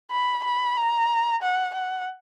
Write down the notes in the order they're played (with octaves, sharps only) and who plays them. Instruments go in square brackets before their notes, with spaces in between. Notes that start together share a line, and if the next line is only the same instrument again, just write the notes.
[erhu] B5
B5
A#5
F#5
F#5